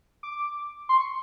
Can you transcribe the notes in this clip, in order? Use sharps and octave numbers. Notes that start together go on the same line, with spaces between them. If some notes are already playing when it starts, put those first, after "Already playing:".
D6
C6
C#6